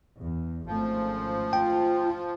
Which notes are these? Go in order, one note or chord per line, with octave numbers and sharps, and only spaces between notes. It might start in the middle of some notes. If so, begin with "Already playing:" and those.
E2
G#1 F3 A3 C#4
F4 G5